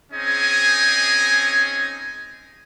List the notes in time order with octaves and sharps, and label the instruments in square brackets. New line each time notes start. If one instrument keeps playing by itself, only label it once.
[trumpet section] C4 C#4 D#4 G#4 D#5 G#5